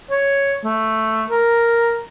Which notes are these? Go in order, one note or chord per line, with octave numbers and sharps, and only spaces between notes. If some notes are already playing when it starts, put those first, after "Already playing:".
C#5
A3
A#4